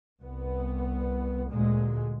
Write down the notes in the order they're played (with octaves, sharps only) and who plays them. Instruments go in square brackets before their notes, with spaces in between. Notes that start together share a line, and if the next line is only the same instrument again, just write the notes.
[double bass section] C2 B3
D2 A#2 G#3